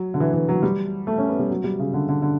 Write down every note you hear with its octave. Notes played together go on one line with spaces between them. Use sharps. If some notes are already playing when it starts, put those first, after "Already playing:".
Already playing: F#3
D3
E3
E3
F#3
G3
A3
C#4
B3
G3
F#3
G3
C#3
D3
D3
D3